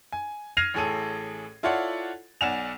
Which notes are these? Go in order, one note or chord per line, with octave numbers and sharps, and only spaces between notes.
G#5
F6 G#6 A#6 C7 D#7 F7
A1 A2 G#4 A4 D#7
E4 F4 A4 C#5 D5 F#5
B1 D5 F#5 G#5 E7 F7